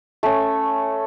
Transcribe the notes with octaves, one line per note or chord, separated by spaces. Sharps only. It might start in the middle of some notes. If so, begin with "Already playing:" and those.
A3 C#4